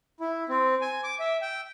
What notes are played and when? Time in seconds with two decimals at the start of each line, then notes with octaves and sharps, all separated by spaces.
0.20 E4
0.49 C4
0.81 G#5
1.03 D6
1.20 E5
1.42 G5